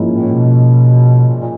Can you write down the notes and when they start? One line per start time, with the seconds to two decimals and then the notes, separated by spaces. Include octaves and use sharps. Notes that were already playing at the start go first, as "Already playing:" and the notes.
Already playing: G#2 F3 A#3 C#4 E4
0.13 A2
0.33 B2
1.28 A#2
1.40 A#2